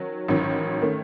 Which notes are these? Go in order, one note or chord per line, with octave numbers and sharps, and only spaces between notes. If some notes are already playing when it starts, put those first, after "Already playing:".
Already playing: D#3 F#3 C#4
A1 G#2 D#3 F#3 C#4
D#3 A3 C#4